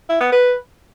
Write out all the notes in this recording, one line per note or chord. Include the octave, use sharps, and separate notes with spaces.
E4
B3
B4